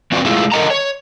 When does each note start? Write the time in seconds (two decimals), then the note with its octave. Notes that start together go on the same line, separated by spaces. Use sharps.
0.12 F3 C4 F#4 B4 D5
0.25 G#3 A3 E4 F4 G#4 A4
0.52 A4 A#4 D#5 F#5 A5 A#5
0.70 C#5